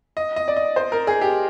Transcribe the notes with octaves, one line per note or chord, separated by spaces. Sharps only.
D#5
D#5
D5
D#5
C5
A#4
G#4
G4